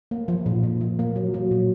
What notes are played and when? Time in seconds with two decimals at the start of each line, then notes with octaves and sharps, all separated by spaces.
0.11 A#3
0.28 F3
0.46 A#2
0.63 A#2
0.81 F3
0.99 A#3
1.16 F#3
1.34 F#3
1.51 A#2